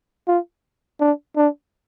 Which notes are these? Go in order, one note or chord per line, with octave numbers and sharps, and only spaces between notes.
F4
D4
D4